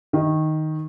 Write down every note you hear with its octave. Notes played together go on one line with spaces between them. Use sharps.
D#3